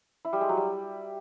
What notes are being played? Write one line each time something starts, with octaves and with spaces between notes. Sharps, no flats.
E4
G3
G#3
F#3
G3